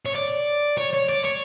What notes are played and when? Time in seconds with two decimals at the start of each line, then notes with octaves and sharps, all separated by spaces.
0.06 C#5
0.15 D5
0.77 C#5
0.93 C#5
1.09 D5
1.24 C#5